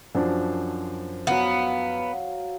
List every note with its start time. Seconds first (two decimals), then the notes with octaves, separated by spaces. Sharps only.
0.15 F#2 F3 D4 C5
1.27 F#3 B3 F5